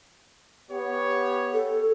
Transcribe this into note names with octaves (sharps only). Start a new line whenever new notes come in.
B3 G4 C#5
A4